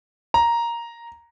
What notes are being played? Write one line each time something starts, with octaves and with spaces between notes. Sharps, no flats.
A#5